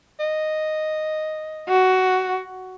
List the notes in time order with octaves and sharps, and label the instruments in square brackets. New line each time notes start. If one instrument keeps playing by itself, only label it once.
[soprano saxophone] D#5
[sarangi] F#4